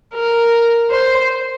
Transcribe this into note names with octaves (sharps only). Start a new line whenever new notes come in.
A#4
C5